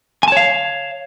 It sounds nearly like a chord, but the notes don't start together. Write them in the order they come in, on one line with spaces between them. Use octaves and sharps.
G#5 A5 C#5 F5